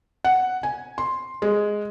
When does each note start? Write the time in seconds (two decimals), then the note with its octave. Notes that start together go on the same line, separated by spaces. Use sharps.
0.25 F#5
0.63 G#5
0.98 C6
1.42 G#3